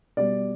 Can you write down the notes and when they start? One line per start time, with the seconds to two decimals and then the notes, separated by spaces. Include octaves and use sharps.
0.17 B2 G3 D5